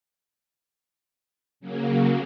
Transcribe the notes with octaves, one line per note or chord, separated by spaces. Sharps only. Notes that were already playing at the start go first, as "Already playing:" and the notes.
C#3 F#3 A#3